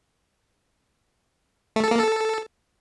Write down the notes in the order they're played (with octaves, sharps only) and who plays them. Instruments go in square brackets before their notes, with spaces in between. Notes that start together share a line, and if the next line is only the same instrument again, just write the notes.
[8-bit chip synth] A3
A4
A#3
A4